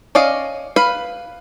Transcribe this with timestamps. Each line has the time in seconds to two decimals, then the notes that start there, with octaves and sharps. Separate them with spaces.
0.15 C#4 D5 D#5 F5
0.76 B4 F5 B5